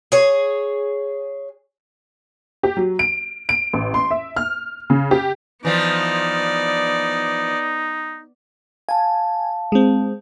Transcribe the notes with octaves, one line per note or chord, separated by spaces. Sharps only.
G#4 C#5
G4
F#3
D7
D7
A1
C6
E5
F6
C#3
G4
E3 F3 B3 D#4 D5
F5 G#5 A5
G#3 C4